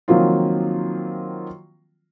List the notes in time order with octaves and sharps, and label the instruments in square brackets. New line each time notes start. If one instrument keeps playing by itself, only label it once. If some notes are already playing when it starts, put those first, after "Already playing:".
[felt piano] D#3 F3 F#3 A#3 C4 F4